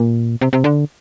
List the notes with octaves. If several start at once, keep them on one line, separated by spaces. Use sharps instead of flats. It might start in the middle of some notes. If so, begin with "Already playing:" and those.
Already playing: A#2
C3
C3
D3